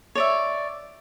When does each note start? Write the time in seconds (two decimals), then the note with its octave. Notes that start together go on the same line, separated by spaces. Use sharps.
0.15 C#5 D5 E5